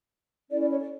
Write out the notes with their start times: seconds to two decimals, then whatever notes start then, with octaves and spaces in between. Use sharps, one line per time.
0.50 C#4 E4 A4 D5
0.61 D5
0.70 C#5
0.81 D5